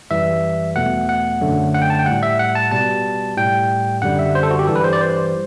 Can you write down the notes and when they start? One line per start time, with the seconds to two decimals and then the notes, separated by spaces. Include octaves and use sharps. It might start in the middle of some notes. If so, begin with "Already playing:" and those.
0.10 F#2 E3 G3 E5
0.76 E2 B2 A3 F#5
1.09 F#5
1.41 F#2 D3 F#3 A3
1.74 F#5
1.82 G5
1.90 A5
1.99 G5
2.06 A2 G3 F#5
2.23 E5
2.39 F#5
2.55 A5
2.72 B2 G3 A5
3.37 A2 G3 G5
4.02 F#2 D3 G3 F#5
4.19 E5
4.35 C5
4.43 A4
4.51 F#4
4.59 G4
4.67 G2 E3 G3 A4
4.76 B4
4.84 C5
4.93 D5
5.01 C5